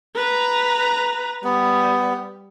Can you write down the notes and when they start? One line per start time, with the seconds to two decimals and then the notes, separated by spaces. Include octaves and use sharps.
0.15 B4 A#5
1.44 G3 B3